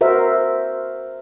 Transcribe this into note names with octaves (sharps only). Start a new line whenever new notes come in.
F#4 A#4 C5 E5